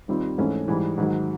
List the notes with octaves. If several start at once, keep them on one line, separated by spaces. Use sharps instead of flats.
D#2 D#3 G3 C4 F4
G#2 E3 A3 C#4
G#2 E3 G3
G#2 D#3 F#3